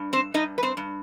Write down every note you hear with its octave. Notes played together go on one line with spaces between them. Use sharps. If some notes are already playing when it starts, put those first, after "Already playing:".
Already playing: G2
C4 C5
G2 D#4 D#5
B4
C4 C5
G2